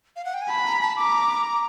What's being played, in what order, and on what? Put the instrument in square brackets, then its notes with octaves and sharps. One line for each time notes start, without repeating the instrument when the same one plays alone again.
[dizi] F5
F#5
G5
G#5
[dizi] A5 [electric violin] B5
[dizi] A#5
A5
[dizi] A#5 [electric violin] D6